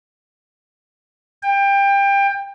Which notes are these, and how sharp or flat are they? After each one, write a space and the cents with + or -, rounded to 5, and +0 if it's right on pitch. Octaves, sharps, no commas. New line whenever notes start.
G5 +25